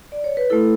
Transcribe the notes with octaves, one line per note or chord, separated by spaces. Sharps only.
D5
C#5
B4
A3 E4 A4